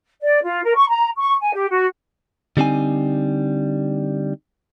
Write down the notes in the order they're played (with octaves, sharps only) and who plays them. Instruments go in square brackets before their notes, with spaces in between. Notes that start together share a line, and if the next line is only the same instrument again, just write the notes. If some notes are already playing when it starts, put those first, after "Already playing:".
[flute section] D5
F4
A#4
C#6
A#5
C#6
G#5
G4
F#4
[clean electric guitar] D3 G3 C4 D#4 G#5